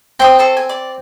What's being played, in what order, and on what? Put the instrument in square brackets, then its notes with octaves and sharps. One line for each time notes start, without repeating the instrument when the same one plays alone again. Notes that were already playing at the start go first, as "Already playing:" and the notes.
[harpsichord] C4 [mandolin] G5 C6 D#6
[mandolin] A4 C5 C#6
G#5
D5